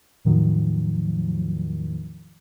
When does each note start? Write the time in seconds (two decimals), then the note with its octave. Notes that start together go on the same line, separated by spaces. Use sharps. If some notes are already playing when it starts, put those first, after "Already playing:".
0.25 E2 A2 D#3 F3 F#3